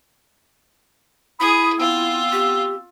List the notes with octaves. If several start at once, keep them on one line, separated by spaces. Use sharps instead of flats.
E4 G#4 B5 D#6
B3 C4 F4 E6
G4